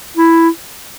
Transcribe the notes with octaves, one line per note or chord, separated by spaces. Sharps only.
E4